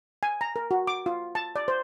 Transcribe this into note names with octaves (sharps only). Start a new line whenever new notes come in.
G#5
A#5
A#4
F#4
D6
F4
A5
D5
C5